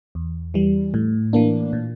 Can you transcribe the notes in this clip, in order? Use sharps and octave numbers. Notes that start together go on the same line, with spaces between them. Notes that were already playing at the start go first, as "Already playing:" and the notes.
E2
E3 G3
A2
E3 A#3 D4
A#2